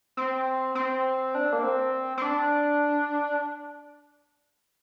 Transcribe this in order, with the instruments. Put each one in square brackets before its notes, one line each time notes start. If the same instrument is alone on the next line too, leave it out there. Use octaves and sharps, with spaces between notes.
[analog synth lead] C4
C4
D4
A#3
C4
C4
D4